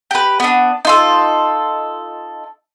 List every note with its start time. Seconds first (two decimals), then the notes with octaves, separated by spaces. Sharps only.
0.11 G4 B4
0.40 B3 D4
0.85 D#4 F4 A4